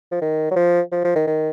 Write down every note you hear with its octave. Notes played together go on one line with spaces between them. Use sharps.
F3
D#3
F#3
F3
F3
F3
D#3
D#3